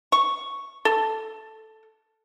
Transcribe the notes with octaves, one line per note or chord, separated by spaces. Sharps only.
C#6
A4